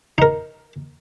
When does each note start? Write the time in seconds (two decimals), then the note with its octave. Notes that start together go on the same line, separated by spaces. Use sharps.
0.18 D#4 A#4